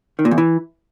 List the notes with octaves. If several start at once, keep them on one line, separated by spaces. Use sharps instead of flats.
D#3
A#2
E2
E3